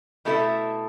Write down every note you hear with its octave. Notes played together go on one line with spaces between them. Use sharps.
B2 A3 E4 A4 E5